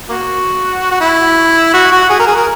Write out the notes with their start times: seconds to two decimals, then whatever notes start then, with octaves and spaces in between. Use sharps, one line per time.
0.09 A#3 F#4
0.91 F#4
1.01 E4
1.74 F#4
1.92 F#4
2.09 G#4
2.19 A#4
2.27 G#4
2.37 A#4